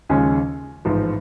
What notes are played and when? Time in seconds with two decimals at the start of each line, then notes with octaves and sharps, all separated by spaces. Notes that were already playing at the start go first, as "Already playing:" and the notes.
0.09 D#2 C#3 F3 G#3 C#4
0.85 A1 G#2 F3